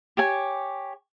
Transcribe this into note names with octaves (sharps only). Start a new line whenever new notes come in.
G4 C#5 G#5